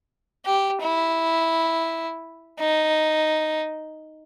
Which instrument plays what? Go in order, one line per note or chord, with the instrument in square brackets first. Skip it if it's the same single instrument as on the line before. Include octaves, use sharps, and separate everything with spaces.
[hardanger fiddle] G4
E4
D#4